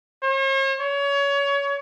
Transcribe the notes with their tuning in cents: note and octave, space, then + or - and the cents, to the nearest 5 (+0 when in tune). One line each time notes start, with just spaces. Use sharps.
C#5 -45
C#5 +25